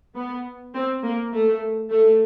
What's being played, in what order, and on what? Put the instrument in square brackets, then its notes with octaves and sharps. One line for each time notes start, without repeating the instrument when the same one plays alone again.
[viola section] B3
C4
A#3
A3
A3